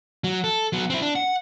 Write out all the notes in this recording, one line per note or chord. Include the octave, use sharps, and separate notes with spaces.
F#3
A4
F#3 B3
C4 E4
D4
F#5